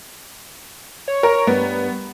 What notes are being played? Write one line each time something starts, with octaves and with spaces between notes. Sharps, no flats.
C#5
A#4
G2 B3